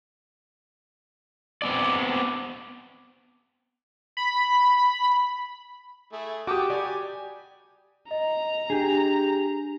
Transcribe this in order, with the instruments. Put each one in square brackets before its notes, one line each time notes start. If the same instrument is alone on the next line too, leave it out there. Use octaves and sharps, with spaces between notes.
[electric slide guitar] B3 C4 D5
[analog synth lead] B5
[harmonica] A3 E4 G#4
[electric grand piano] F#4 G4 [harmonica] G5 A5 [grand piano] D6 D#6
[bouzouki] G3 [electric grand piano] G4 [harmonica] G#5
[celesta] D#5 [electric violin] A#5
[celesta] D4 [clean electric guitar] G4 G#4